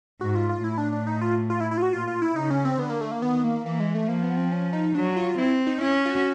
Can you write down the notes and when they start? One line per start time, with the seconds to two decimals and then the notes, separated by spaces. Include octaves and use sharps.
0.21 G#2 F#4
0.35 F4
0.49 F4
0.64 A2 E4
0.78 D4
0.92 D4
1.07 D#4
1.21 F4
1.50 F4
1.60 E4
1.71 E4
1.78 F4
1.82 F#4
1.92 A#2 F4
2.07 F4
2.22 E4
2.36 C#3 D#4
2.50 C#4
2.65 C4
2.79 D3 B3
2.90 A#3
3.01 A3
3.11 A#3
3.22 D#3 B3
3.44 A#3
3.65 E3 A#3
3.80 G#3
3.95 A3
4.08 F3 A#3
4.23 B3
4.37 C4
4.52 C#4
4.73 D#4
4.95 F#3 D4
5.16 F4
5.38 C4 E4
5.67 D#4
5.81 C#4 E4
6.06 F4
6.10 F#4